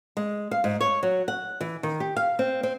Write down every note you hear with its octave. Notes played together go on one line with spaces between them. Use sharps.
G#3
F5
G#2
C#5
F#3
F#5
E3
D#3
G4
F5
C4
C4